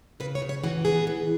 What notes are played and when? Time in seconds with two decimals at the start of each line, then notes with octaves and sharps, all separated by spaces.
0.20 C#3 B4
0.35 C#5
0.42 C#3
0.49 C#5
0.64 E3 F#4
0.85 B3 G#4
1.07 E3